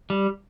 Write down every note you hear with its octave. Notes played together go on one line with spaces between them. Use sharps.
G3